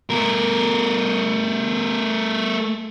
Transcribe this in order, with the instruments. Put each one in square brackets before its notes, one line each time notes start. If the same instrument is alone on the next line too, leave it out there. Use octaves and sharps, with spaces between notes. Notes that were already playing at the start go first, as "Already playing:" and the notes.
[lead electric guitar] A3 A#4